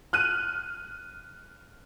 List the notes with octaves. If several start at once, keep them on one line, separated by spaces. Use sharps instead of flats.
F6 F#6 D#7